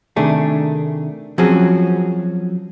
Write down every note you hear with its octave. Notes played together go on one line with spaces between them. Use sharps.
C3 D#3 A3 D4 G#4
F3 F#3 C4 C#4 F#4 G#4